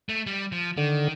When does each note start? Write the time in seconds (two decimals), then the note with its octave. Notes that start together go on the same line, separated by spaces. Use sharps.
0.09 A3
0.26 G3
0.52 F3
0.77 D3 D#3